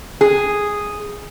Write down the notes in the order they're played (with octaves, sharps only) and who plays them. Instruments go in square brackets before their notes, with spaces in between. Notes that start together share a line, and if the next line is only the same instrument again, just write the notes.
[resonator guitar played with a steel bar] G#4